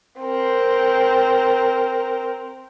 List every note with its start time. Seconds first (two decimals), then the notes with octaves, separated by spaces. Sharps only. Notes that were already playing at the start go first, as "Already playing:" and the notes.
0.20 C4 A#4